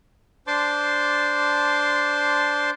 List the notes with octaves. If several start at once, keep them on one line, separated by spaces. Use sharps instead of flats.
D4 C5 A5 C6 D6